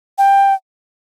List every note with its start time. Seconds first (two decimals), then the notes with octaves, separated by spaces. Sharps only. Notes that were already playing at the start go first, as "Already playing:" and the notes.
0.18 G5